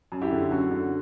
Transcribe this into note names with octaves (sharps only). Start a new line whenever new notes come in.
F#2
E4 G4
D3
F#2 F#4
D3